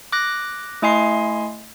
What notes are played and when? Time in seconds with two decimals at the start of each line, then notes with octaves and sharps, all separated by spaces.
0.12 D6 F#6 A#6
0.82 A3 E4 D#5 G#5 C6 C7